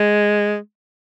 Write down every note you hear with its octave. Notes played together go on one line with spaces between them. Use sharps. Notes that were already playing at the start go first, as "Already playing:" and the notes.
Already playing: G#3